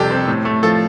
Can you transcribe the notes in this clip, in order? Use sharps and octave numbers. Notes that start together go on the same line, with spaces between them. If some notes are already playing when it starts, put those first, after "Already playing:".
Already playing: F2 C3 G3 G4 A4
C4
A2
A3
F3 A4